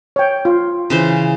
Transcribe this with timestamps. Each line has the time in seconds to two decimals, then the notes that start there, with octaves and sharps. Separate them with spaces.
0.16 C#5 G5
0.45 F4
0.90 C#3 E3 C5